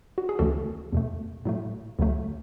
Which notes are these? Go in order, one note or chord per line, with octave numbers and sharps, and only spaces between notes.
F#4
G#4
D2 C#3 E3 A3 F#4 A4
E2 B2 A3
A2 F#3 A3
D2 D3 F#3 A3